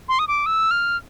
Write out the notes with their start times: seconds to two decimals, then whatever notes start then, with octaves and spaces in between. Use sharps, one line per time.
0.09 C6
0.19 D#6
0.28 D6
0.46 E6
0.71 F6